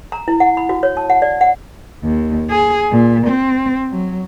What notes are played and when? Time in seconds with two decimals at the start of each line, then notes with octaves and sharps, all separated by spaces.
0.12 A#5
0.28 E4
0.40 F#5
0.57 B5
0.69 F#4
0.83 C#5
0.97 A5
1.10 F#5
1.22 D5
1.41 F#5
2.04 D#2
2.50 G#4
2.92 A#2
3.28 C4
3.91 F#3